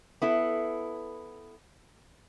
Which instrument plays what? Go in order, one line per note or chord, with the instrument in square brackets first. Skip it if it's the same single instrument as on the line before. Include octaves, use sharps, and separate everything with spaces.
[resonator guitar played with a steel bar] B3 E4 A4